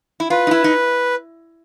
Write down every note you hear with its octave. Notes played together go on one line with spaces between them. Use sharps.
E4
F4 B4
D#4
E4
D#4